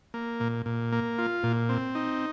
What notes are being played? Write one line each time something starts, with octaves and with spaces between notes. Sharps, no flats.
A#3
A#2
A#2
A#3
F4
A#2
C4
D#4